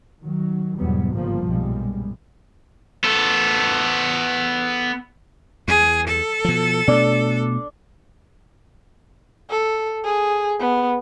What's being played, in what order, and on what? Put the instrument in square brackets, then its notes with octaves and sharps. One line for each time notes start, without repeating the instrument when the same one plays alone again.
[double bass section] D#3 F#3
E2 G#2 B2 F#3 G3 B3
G1 C#3 F3 G3 A#3
B1 F#2 A#2 G3 G#3
[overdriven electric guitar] B3 A4
[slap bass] E2 [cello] G#4
[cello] A4
[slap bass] B2 F3
[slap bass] B2 A3 [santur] D4
[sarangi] A4
G#4
B3